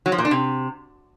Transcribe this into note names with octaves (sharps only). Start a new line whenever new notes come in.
F#3
F3
A#2
D4
C3